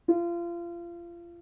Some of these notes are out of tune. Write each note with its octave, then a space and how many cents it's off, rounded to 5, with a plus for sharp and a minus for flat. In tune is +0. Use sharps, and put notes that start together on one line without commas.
F4 -30